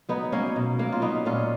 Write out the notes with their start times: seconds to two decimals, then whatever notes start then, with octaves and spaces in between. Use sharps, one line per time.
0.09 F#3 B3 D#4
0.32 F#3 A#3 C#4
0.56 B2
0.79 F#3 A#3
0.92 F4
1.02 F#3 B3 D#4
1.25 A#2 C#4 F4